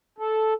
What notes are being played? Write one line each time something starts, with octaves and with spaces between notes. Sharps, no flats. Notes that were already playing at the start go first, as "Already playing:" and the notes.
A4